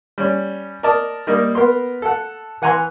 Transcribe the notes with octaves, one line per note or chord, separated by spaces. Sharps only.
G3 C#4
A#4 D5 D#5 A5
G3 A#3 D#4
B3 A#4 C6
A4 F#5
E3 F#5 G#5 A#5 C6